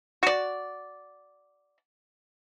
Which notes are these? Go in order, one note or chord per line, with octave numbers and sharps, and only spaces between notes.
F#4 D5